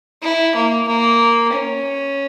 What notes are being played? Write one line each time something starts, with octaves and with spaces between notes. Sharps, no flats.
E4
A#3
A#3
C#4